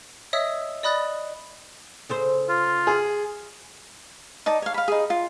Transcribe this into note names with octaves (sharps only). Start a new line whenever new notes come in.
C#5 D#5 E5 D#6 E6 B6
D5 D#5 B5 D#6 F#6 A6
C#3 A4 C5
F4
G#4
D#4 D5 A5
C#5 F5
F5 B5
D#4 G#4
F4